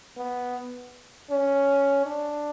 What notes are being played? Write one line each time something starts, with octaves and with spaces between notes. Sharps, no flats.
B3
C#4
D4